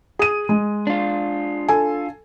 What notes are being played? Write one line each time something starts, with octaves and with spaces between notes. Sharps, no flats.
G#4 D#7
G#3
D4 F4
A4 G#5